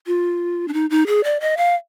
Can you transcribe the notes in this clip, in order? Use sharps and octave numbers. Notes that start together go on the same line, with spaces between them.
F4
D4
D#4
D#4
G#4
D5
D#5
F5